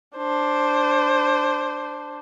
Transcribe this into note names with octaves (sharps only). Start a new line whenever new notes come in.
D4 C5